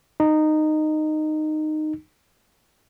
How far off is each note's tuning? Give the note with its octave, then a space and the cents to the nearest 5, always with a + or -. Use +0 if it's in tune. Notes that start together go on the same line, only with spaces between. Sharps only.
D#4 -15